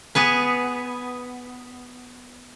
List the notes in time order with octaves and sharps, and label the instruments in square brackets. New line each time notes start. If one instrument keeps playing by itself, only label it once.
[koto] B3 G#4 B4